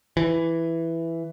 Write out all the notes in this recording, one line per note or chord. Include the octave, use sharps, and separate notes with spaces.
E3